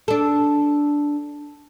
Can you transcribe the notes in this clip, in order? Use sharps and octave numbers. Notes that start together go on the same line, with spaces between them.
D4 A4